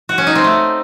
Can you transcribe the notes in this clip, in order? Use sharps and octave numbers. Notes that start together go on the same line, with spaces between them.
F#4
C#4
D#4
C4
A3